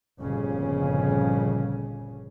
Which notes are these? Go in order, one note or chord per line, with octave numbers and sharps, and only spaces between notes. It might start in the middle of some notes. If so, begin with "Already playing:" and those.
G1 F2 A#2 C#3 C#4